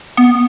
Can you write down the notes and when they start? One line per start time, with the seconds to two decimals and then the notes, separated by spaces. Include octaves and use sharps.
0.17 B3